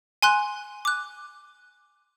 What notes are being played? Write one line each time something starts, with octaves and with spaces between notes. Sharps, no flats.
G#5 C6 F#6
D6 F#6